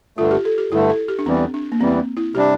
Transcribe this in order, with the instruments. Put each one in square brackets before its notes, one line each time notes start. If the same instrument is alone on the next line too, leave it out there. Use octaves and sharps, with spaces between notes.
[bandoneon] G2 D3 A3 [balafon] F4
[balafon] G4
A4
G4
[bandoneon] G2 D3 A3 [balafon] E4
[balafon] A4
G4
D4
[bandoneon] E2 E3 G3 [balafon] C4
[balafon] D4
A#3
[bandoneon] E2 E3 G3 [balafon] C4
[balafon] E4
[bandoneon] C3 G3 D4 [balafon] G4